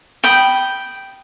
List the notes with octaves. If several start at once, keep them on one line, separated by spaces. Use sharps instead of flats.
G5 B5 D#6